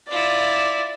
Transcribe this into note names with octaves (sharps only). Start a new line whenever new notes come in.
E4 F4 D5